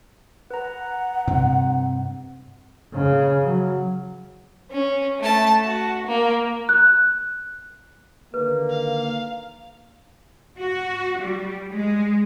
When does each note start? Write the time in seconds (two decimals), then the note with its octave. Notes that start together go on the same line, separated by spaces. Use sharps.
0.51 B4 F#5 A#5
1.27 G2 C3 C4
2.94 C#3
3.44 F#3
4.71 C#4
5.20 A3 A5
5.65 F#4
6.07 A#3
6.69 F#6
8.34 D3 D#3 A#3 B4
8.70 F5
10.58 F#4
11.19 G3
11.72 G#3